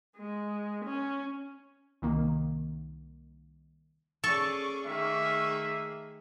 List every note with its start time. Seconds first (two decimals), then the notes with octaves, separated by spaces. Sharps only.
0.17 G#3
0.85 C#4
2.02 C2 D#3 A#3
4.24 C#4 G#4 A4 D5 C#6
4.86 D#3 A3 A#3 G#4 E5